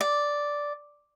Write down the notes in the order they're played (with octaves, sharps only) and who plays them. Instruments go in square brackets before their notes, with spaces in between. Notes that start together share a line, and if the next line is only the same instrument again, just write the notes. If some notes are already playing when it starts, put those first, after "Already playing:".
[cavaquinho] D5